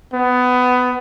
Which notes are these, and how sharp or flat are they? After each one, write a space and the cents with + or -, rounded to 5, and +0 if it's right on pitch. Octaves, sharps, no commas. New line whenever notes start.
B3 +20